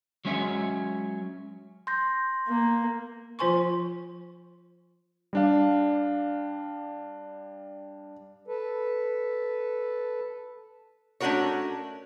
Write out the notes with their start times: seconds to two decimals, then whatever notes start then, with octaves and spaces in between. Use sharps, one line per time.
0.25 F#3 G#3 C#4 C#5 E5
1.87 C6 G6 A#6
2.48 A#3
3.39 F3 F4 C5 G#5 C6 C#6
5.33 G3 D4 F5
8.48 A4 B4
11.20 A3 C#4 D4 F#4 A#4 C#5